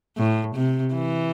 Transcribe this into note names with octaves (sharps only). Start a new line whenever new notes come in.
A2
C3
E3